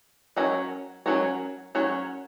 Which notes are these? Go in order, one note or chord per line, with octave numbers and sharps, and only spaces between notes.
F#3 C#4 F#4 A#4 C#5
F#3 C#4 F#4 A#4 C#5
F#3 C#4 F#4 A#4 C#5